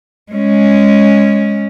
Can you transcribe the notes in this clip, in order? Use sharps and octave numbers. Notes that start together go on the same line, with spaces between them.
G#3 C#4